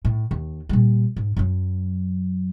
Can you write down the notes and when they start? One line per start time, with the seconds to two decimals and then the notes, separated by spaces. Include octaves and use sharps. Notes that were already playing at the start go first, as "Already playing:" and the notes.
0.05 A2
0.31 D#2
0.69 A#2 G3
1.16 G#2
1.37 F#2 F#3